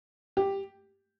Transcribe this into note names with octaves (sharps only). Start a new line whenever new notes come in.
G4